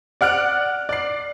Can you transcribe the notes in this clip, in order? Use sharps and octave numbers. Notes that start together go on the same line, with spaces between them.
D5 F#5 F6 F#6 D7
D5 C7